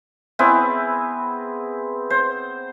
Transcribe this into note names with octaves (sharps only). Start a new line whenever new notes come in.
B3 C4 E4 G#4
C5